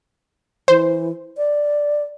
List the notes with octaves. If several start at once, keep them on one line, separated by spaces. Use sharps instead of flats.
E3 C5
D5